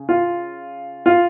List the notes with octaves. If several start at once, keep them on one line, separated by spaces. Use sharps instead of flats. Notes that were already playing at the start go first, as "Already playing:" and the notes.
Already playing: C#3
F4
F4